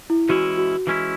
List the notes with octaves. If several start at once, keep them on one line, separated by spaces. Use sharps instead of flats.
E4
E3 G#3 C#4 E4 F#4
F#4
E3 G#3 C#4 E4